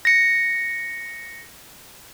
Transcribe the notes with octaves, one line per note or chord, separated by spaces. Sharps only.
A#6 C#7